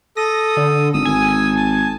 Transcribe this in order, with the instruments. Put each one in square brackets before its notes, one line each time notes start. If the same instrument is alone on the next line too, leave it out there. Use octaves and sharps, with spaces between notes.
[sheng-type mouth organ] A4 D#6 [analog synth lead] A#6
[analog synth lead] D3
[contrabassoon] G#1 [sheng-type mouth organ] D#6 E6
[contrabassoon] G#1 [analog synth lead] G#5
[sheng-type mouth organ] A5